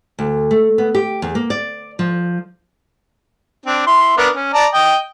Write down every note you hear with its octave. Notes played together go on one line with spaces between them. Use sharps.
D2
A3
B3
G4
E2
A#3
D5
F3
C4 D4
E4 C6
B3 D4 A#4
C#4
D5 A5 A#5
D#5 G5